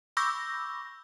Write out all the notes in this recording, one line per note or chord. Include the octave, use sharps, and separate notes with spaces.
B5 C#6 D6 E6 G6 A#6